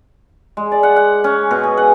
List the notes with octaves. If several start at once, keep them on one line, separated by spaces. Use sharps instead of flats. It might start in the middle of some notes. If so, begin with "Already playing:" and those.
G#3
D5
F#5
F#5
C#4
B2
G#4
F#5